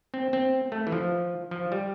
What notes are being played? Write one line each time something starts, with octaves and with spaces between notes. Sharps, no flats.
C4
C4
A3
E3
F3
F3
G3